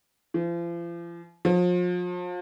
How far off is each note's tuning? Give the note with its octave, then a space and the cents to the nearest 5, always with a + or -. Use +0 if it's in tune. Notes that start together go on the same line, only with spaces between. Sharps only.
F3 -40
F3 +35